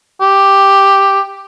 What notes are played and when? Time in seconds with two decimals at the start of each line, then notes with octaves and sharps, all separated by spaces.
0.21 G4